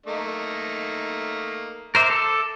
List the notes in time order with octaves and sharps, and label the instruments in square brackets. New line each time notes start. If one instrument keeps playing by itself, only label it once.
[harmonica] A3 A#3 D#4
[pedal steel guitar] A#4 C5 E5 [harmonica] D6
[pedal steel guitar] A4